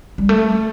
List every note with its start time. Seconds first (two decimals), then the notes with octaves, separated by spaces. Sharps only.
0.18 G3
0.29 A3